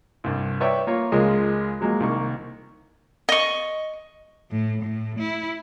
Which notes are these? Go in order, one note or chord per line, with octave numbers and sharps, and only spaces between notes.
C2 G2
B4 C#5 D5 E5 G5
A#3 F4 C#5
C#2 G#3 F4 G#4 A#4 D#5
F3 F#3 G#3 A#3
C2 D#3 A#3 C#6
D#5 C#6
A2
A2
E4